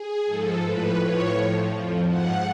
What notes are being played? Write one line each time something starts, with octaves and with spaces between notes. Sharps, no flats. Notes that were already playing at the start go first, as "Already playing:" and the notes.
Already playing: G#4
G#2 F3 A4
A2 F3 B4
A2 F3 C#5
A2 F3
F2 F3
G#2 F3 F#5